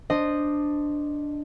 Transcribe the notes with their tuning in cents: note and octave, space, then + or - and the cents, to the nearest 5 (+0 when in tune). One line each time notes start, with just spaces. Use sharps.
D4 +0 C5 +0 D#5 -10